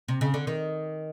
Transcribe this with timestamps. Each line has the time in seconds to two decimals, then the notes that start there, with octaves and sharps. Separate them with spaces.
0.08 C3
0.21 C#3
0.34 D3
0.47 D#3